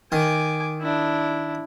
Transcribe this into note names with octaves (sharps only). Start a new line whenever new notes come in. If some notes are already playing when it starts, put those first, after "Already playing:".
D#3 G#5 D6
D4 E4